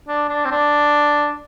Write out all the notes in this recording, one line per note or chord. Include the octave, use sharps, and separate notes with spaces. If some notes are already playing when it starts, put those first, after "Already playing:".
D4
D4
C4
D4